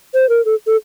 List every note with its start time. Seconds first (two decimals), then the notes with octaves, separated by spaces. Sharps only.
0.14 C5
0.29 A#4
0.45 A4
0.67 A4